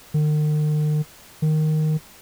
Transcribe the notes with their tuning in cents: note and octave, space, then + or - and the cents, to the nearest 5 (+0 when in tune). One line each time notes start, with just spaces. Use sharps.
D#3 -45
D#3 -5